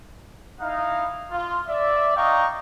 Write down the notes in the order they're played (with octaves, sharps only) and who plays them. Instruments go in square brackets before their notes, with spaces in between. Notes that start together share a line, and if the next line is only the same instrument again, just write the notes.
[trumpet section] D#4 E4 F5
F4
D5 E5
D#4 D#5 F5 G5 A#5 C#6